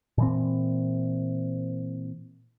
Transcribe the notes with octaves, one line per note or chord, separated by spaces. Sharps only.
A#2 E3 C4